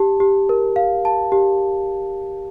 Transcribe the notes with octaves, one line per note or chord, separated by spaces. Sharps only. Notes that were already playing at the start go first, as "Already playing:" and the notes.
Already playing: G4 A5
G4
A#4
F5
A5
G4